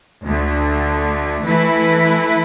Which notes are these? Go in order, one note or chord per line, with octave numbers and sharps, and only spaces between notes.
D2 D3 A3
E3 A3 E4 B4